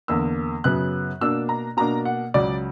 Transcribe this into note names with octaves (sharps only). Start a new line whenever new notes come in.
E2 D3 A#3 E6
F#2 C#3 F#3 B3 F#6
B2 A#3 D4 E6
A#5
B2 A#3 D4 A#5
F#5
C#2 C#3 F#3 D5